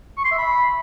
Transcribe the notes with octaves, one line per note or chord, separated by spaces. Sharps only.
C#6
C6
E5
B5